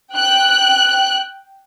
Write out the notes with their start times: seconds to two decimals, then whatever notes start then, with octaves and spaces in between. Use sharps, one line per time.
0.14 G5 F#6